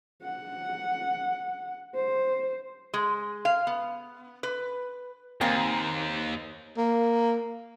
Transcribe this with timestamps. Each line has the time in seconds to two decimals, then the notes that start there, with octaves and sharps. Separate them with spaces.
0.23 F#5
1.95 C5
2.94 G#3
3.45 F5
3.67 B3
4.43 B4
5.41 D#2 A#3 C4 G#5
6.77 A#3